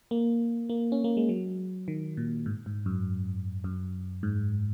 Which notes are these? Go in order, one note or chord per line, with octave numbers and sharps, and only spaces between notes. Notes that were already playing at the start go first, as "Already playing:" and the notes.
A#3
A#3
C#4
A#3
G#3
F#3
D#3
A#2
G#2
G#2
F#2
F#2
G#2